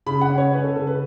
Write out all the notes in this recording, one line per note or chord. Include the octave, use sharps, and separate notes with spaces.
C#3 B5
F#5
C#4
C#5
C#4 B4
A4
C#3 A4
B4